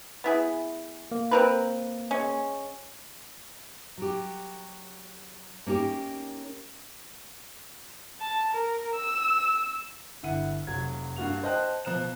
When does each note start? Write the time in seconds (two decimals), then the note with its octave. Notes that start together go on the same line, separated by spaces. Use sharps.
0.24 B3 E4 G#4
1.11 A#3
1.31 C4 A#4 B4
2.11 G#3 C#4
3.98 F#3 G4
5.66 A#3 C#4 D#4 G4
8.20 A5
8.52 A#4
8.95 E6
10.23 G1 D3 E4 E5 F#5 D#7
10.67 F1 F#3 G#6
11.16 G2 A#3 F#4 F7
11.44 C5 D#5 G5 A5 F#6
11.85 B2 F3 A#5 F#6 E7